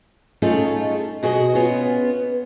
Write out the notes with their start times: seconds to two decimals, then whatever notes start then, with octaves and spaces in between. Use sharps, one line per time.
0.42 A3 C#4 D#4 F4 G#4 A4
1.23 B2 F#4 G#4 C#5 D#5
1.55 B3 C#4 F4